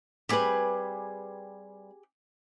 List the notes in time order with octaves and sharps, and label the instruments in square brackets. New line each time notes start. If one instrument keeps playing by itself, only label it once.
[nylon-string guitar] G3 C4 B4 [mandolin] G4 G#4